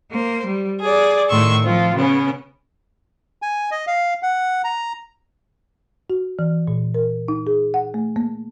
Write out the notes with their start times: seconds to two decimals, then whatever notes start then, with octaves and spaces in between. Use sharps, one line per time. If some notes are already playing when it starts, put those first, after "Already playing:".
0.12 A#3 C5
0.46 G3
0.82 G#4 D5
1.30 A2 D#3 C6 C#6 E6
1.64 F3 C4 F4
1.95 C#3 B3 C#4
3.42 G#5
3.71 D#5
3.87 F5
4.23 F#5
4.64 A#5
6.10 F#4
6.39 E3
6.68 A#2
6.94 A#4
7.28 D#4
7.47 G#4
7.74 F#5
7.94 A3
8.16 A#3